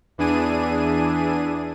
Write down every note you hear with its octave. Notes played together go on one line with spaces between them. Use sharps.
E2 E3 D4 G#4 D#7